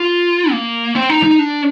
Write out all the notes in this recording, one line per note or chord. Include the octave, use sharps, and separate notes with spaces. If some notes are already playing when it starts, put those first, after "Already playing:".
Already playing: F4
A#3
C4
D#4
D#4
D4